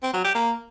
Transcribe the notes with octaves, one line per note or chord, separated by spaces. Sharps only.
C4
F#3
G4
A#3